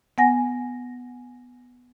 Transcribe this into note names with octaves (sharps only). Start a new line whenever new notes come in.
B3 F#5 G#5 A#6